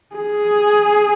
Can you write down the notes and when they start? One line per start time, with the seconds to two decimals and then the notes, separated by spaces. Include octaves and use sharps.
0.16 G#4